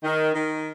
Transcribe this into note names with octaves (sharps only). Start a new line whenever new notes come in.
D#3
D#3